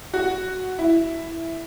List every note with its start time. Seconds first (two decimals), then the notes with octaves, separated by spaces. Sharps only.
0.14 F#4
0.78 E4